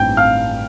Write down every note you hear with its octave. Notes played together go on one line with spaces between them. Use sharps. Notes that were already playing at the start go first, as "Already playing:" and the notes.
Already playing: A1 G2 G5 G6
F5 F6